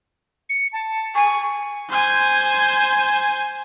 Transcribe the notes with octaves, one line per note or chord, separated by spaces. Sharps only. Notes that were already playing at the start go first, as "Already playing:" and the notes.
C#7
A5
G#5 C#6
C5 G#5